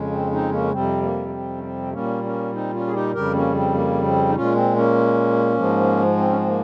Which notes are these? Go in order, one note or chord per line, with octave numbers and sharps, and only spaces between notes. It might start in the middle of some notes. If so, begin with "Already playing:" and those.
Already playing: F2 C#3 G#3
C4
C4 D#4
A#3 C#4
F2 C3 G3 C4
A#3
A#3
C4
C#4
C4
A#2 G3 A#3 C#4
A#3 C#4
C4 D#4
C#4 F4
G#4
D#4 G4
F2 C#3 G3 G4 A#4
A#3 C#4
C4
A#3
C4
D#4
A#2 G#3 C#4 F4
C4
A#3 C#4
G#2 F3 G#3
C4
C#4
C4
A#3